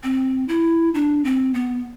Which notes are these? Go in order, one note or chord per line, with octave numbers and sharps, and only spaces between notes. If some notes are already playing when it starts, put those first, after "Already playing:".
C4
E4
D4
C4
B3